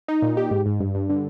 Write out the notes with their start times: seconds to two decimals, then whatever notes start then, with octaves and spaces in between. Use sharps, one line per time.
0.08 D#4
0.22 A#2
0.37 G4
0.51 G#2
0.66 G#2
0.80 G2
0.95 G2
1.09 D3